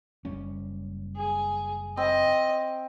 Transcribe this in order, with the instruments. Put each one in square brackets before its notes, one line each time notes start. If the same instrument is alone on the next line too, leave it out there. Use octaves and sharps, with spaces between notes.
[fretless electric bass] F#1 G3 C#4
[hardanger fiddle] G#4
[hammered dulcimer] C4 [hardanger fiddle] D#5